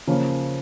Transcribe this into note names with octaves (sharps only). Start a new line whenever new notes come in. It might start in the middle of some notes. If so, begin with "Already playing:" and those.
C#3 F3 A#3 C#4